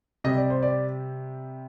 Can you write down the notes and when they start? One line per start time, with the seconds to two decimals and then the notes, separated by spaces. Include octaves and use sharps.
0.24 C3 G3 D#5
0.38 D5
0.50 C5
0.63 D5